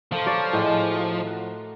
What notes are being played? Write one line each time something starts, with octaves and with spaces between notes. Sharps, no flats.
F3 A3 A#3 C6
C#5 D5
A2 G#3 D#6
F#4
F#5 A#5